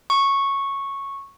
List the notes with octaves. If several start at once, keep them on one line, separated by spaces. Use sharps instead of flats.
C#6